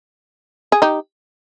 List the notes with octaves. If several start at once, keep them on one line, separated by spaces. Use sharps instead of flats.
G#4
D#4 G4